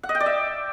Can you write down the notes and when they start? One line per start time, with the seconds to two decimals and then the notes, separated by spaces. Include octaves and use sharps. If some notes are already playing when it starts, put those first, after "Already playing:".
0.03 F#5
0.09 D#5
0.15 G5
0.20 D5
0.26 E5